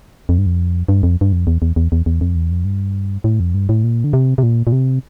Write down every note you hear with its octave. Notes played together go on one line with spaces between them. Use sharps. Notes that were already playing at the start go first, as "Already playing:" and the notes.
F2
G2
F2
G2
F2
G2
F2
E2
E2
E2
E2
E2
F2
E2
F2
G2
A2
F2
G2
A2
A#2
D3
C3
C3
A#2
A#2
C3